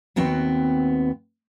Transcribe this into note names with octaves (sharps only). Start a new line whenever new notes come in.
D#2 B3 C4 F#4 G5